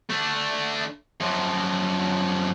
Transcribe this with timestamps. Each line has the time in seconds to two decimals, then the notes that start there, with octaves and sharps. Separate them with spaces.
0.10 A3 D4
1.20 F#2 F3